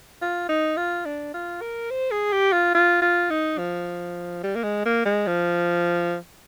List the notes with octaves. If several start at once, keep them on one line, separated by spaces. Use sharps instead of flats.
F4
D#4
F4
D4
F4
A#4
C5
G#4
G4
F4
F4
F4
D#4
F3
G3
A#3
G#3
A#3
G#3
F3